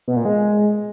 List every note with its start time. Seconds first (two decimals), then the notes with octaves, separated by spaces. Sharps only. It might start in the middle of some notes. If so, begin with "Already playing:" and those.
0.08 B2
0.16 A#2
0.25 G#3